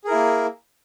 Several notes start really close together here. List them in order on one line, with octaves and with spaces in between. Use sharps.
G#4 A#4 E4 A#3